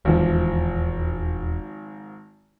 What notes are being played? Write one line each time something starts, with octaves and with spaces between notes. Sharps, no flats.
D#1 G#1 E2 E3 F3